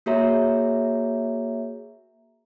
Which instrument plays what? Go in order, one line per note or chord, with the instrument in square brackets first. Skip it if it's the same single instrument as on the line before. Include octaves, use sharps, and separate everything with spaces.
[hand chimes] A#3 F#4 G#4 C#5 E5 A#5